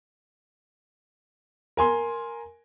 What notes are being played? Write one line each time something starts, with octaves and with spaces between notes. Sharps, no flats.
A#4 G#5 C6